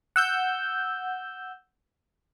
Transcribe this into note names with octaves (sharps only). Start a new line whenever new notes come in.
F#5 E6 G6